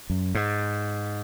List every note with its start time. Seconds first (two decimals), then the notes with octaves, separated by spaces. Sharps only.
0.10 F#2
0.35 G#2